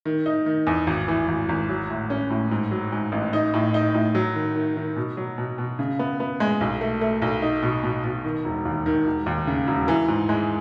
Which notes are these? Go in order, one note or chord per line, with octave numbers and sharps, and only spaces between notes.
D#3
D#4
D#3
E2
G#1
E3
G#1
G#1
F#3
A2
C#4
A2
G#2
F#3
G#2
A1
D#4
A2
D#4
A2
F#3
D#3
D#3
D#3
B2
F#3
B2
B2
C#3
B3
B3
G#3
B1
A3
A3
B1
D#4
B2
B2
B2
D#3
E1
D#2
D#3
E1
D#2
C#3
E1
E3
G#2
G#3